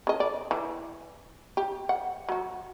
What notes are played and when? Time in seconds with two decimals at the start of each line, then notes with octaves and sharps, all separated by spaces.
0.07 C#3 D#5
0.20 D5
0.51 E3
1.57 G4
1.89 F#5
2.29 F#3 F#4